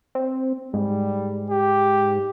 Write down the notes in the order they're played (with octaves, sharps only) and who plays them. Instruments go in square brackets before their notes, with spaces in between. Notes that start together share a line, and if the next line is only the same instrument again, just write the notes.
[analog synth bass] C4
[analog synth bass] G#2 [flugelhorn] G3
[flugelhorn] G4